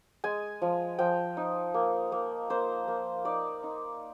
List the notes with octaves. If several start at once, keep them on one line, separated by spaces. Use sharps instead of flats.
G#3 G#5
F3
F3 G5
D#4
A#3
A#3
A#3 C5
A#3
D#4 D5
D#4